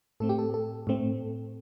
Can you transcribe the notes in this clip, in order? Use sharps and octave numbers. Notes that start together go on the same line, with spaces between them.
A2 A3 C4 A4
G4
A4
A4
A2 A3 C4